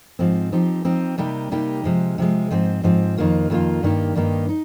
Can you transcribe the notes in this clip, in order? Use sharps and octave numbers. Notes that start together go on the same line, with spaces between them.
G#2 F3 C4
F3 C4 D#4 G4
F3 C4 D#4 G4
C3 G3 A#3 D#4 G4
C3 G3 A#3 D#4 G4
C3 F3 G#3
C3 F3 G#3
G#2 F3 C4
G#2 F3 C4
F2 D#3 A#3 F4
F2 D#3 A#3 F4
G2 D#3 A#3 D#4 G4
G2 D#3 A#3 D#4 G4
D#4